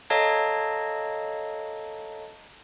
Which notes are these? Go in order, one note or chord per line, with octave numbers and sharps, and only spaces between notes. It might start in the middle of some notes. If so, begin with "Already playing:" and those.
A4 C#5 D#5 F5 A5 A#5